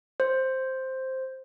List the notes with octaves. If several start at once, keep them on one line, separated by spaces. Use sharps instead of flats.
C5